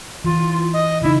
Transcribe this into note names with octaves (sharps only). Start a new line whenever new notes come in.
E3 F4
D#5
C#3 D#4 E4